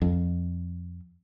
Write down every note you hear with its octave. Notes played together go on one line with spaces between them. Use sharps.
F2